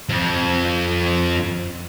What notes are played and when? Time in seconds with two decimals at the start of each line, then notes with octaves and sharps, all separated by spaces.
0.09 F2 F3